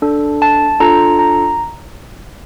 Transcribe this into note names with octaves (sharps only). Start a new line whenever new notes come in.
D4 A4
A5
D4 F4 A4 A#5
A#5